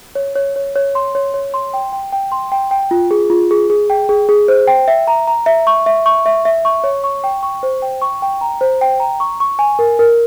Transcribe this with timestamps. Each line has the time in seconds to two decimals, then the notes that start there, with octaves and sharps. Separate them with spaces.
0.15 C#5
0.35 C#5
0.56 C#5
0.76 C#5
0.95 C6
1.15 C#5
1.34 C#5
1.54 C6
1.74 G5
1.93 G5
2.12 G5
2.32 C6
2.52 G5
2.71 G5
2.91 F4
3.11 G#4
3.30 F4
3.51 G#4
3.70 G#4
3.90 G5
4.09 G#4
4.29 G#4
4.48 C5
4.67 G5
4.88 E5
5.07 A#5
5.27 A#5
5.46 E5
5.67 C#6
5.86 E5
6.06 C#6
6.26 E5
6.45 E5
6.65 C#6
6.84 C#5
7.04 C#6
7.24 G5
7.43 C#6
7.63 C5
7.82 G5
8.02 C#6
8.22 G5
8.41 A#5
8.61 C5
8.81 G5
9.00 A#5
9.20 C#6
9.40 C#6
9.59 G#5
9.79 A#4
9.99 A#4